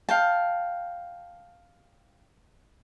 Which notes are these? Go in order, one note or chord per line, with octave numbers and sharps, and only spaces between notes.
F5 G5 A5